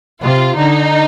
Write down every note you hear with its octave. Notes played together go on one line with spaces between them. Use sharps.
C3 F4
D3 D#4